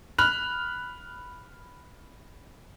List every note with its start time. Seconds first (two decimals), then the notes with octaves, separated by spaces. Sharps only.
0.18 B5 F6 F#6 F7